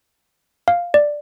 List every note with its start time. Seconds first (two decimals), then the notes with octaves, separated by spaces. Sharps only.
0.68 F5
0.94 D5